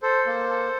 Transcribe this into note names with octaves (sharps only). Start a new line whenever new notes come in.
A4 C5
A#3
A4